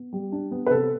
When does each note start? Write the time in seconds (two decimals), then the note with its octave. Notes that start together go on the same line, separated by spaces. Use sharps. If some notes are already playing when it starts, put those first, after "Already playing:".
Already playing: B3
0.13 G3
0.32 D4
0.51 B3
0.66 B4
0.71 C3 A4